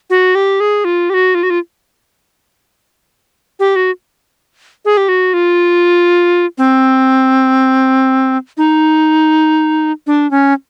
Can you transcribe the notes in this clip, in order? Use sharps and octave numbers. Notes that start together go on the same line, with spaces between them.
F#4
G4
G#4
F4
G4
F#4
F4
F#4
F4
G4
F#4
G#4
G4
F#4
F4
C4
D#4
D4
C#4